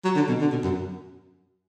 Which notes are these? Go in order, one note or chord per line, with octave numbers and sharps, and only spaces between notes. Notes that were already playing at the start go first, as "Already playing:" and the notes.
F#3
D3
B2
D3
B2
F#2